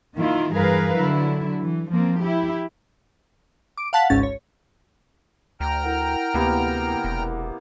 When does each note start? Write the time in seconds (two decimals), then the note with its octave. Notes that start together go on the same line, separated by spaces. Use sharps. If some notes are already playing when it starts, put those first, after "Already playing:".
0.16 D#3 A#3 E4 F4
0.53 G2 E3 G#4 A#4 B4 F5
0.96 D3 F#3 E4
1.62 E3
1.91 F3 A#3 C4
2.21 E4 G4
3.77 D6 D7
3.93 F5 F#5 A5 F#6 B6
4.10 G#1 C#2 G#2 C#4 A6
4.23 C#5
5.60 D2 G5 A#5 F6
5.83 E4 A#4 F#5
6.34 D2 C3 A#3 B3
7.04 E1